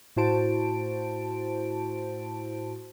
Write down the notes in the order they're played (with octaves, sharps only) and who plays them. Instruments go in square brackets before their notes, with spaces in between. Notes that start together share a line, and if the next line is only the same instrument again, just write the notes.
[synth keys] A2 E4 F#4 C5 A5 D7